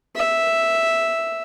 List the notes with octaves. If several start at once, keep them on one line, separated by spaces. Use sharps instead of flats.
E5